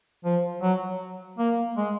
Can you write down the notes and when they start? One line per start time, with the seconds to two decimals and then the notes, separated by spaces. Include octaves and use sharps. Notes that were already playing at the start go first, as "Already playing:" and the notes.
0.25 F3
0.62 F#3
1.38 A#3
1.77 G#3